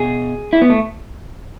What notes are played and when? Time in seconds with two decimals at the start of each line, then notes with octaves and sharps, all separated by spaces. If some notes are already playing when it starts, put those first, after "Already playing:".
Already playing: B2 G#4
0.53 E4
0.62 B3
0.70 A3